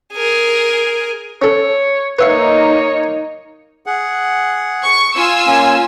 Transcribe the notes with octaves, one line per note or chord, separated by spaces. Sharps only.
G#4 A#4
C#4 A4 C#5
A#3 D#4 B4 C#5 E5 F5
G#4 F#5
C#6
F4 G#5 E6
A#3 C#4